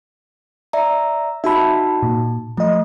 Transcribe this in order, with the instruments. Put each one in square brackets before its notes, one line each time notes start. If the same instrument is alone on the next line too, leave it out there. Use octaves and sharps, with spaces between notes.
[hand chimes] D5 E5 A#5
[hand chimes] D#4 F#4 A5 [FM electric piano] E5 B5
[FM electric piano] A#2
[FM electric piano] F3 D#5 [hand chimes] A3